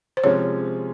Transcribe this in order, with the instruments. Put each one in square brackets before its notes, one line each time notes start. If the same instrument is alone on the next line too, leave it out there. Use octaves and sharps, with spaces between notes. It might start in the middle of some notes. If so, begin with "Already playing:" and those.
[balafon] C5
[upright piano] C3 F3 G#3 C#4 [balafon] C#5